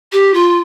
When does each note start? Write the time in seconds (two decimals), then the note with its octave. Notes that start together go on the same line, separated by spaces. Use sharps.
0.12 G4
0.34 F4